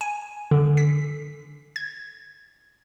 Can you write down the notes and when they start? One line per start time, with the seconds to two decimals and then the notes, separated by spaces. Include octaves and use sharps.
0.01 G#5
0.51 D3
0.77 B6
1.76 G#6